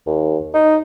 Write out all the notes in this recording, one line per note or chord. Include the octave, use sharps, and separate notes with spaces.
D#2
D#4